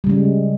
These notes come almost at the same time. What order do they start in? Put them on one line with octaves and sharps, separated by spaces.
G3 C#3 G#3